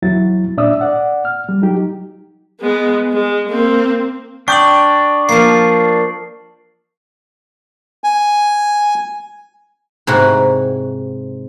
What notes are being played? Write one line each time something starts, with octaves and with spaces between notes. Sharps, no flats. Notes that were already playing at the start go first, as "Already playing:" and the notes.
E2 F#3 E4 A6
A#2 D4 D5 E5 D#6 E6
D5 F#5
F6
G3
F#3 D#4 G4
G#3 B3
G#3
A#3 C4
D4 G5 C#6 D#6 G6 F#7
F3 A#3 C7
G#5
G#2 C3 E4 F#4